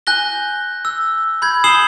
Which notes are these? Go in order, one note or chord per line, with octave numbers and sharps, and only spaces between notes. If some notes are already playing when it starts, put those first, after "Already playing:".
G#5 F#6 G6 A#6 G7
E6
B5 G6 G#6
G#5 D#6 C7 E7 F#7 G7